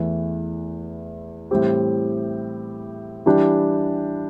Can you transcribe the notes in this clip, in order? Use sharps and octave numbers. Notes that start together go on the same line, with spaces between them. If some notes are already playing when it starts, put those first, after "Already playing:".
Already playing: E2 E3 A3
A2 E3 G3 C4 G4
E3 G3 D4 G4